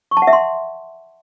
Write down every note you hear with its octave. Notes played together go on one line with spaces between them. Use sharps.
C#6
A5
F#5
E5
C6